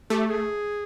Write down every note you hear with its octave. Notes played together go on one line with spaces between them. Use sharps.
A3 G4
G#4